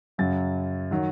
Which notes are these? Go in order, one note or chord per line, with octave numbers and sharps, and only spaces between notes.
F#2 C#3 F#3 A6
D#3 F#3